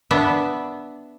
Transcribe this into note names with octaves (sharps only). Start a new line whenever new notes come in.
B3 D4 E5